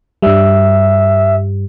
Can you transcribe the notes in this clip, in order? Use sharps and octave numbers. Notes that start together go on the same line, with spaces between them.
G2 G3 E5